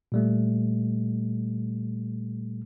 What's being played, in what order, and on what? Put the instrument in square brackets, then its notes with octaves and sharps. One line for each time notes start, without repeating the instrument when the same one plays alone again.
[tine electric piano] A#2 G3 A3